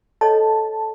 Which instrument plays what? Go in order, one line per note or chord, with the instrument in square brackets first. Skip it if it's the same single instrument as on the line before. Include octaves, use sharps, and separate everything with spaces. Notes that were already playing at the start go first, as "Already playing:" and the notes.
[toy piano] A4 C#5 D#5 [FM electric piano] A5